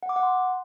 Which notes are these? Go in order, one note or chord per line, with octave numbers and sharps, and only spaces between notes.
F#5
D6
F#5
C6